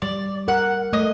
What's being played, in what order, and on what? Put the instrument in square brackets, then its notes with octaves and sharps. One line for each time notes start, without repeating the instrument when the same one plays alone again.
[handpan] G3 [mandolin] D5
[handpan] A#4 [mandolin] F#5
[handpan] A3 [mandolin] D#5